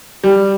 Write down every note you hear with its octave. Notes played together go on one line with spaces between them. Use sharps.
G3